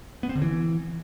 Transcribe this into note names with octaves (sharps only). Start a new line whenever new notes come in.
B3
C4
D3
E3